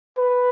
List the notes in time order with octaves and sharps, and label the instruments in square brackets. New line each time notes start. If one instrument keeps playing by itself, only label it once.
[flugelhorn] B4